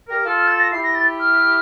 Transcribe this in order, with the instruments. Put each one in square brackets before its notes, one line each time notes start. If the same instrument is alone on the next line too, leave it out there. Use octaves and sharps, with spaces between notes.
[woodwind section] G4 A#4
[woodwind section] F4 A4 [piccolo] F6
[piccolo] F6
A6
A#6
[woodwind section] E4 G4 [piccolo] C7
[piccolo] A#6
A6
F6